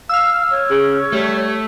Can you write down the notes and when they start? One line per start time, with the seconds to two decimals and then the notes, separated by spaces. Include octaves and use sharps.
0.09 F5 E6 F6
0.51 C#5
0.70 C#3
1.12 G3 A3